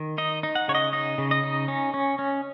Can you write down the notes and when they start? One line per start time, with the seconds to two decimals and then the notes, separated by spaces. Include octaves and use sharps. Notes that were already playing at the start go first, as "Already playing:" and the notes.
Already playing: D#3
0.18 D#4 D#5
0.43 D#4
0.55 F#5
0.68 C#3 C#5
0.75 D#5
0.93 D#4 D#5
1.18 C#3
1.31 D#5
1.43 D#4
1.68 C#4
1.94 C#4
2.19 C#4